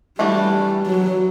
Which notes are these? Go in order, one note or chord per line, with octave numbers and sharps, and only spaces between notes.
E3 G3 A3 D4 F#4
F#3